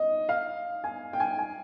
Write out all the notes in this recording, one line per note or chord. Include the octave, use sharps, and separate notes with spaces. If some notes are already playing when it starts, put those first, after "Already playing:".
Already playing: D#5
F5
G#5
G5
G#5
G#5